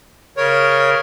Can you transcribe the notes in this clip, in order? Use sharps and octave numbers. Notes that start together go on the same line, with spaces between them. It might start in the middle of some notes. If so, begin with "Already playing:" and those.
C#3 A#4 C#5